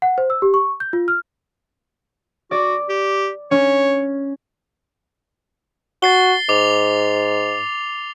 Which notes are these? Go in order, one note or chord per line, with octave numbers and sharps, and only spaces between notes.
F#5
C5
E6
G4
C#6
G6
F4
F6
F#4 D5
G4
C#4 C#5
F#4 A6 C7 G7
G#2 D6 F7